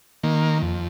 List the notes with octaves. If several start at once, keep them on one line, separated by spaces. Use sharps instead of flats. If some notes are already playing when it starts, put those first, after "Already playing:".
D#3 A#3
F2